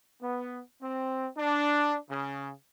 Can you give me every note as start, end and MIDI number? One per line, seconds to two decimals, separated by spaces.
0.21 0.62 59
0.82 1.28 60
1.38 1.96 62
2.10 2.51 49